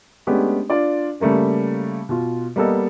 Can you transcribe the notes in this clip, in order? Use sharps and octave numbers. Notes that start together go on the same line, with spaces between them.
G#3 A3 B3 C#4 D4 G4
D4 F4 D5
C#3 G3 A3 A#3 C#4
B2 F4
G3 A#3 B3 A4 D#5